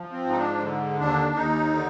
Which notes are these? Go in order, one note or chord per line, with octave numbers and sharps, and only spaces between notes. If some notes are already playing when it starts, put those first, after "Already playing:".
Already playing: F3
C4
G#2
D#4
D4
D3
D#2 D4
D#2 D#4
D3